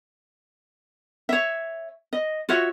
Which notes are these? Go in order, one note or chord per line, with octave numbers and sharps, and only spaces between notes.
C#5 E5
D#5
F4 F#4 C#5 E5